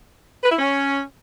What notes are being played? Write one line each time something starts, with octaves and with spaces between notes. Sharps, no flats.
B4
E4
C#4